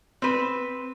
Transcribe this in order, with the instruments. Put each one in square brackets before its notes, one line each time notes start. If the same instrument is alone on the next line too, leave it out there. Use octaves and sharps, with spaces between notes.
[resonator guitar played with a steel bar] C4 B4